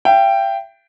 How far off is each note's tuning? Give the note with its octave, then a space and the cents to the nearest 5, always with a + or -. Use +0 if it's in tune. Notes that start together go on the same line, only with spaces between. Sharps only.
E5 +45 G5 +0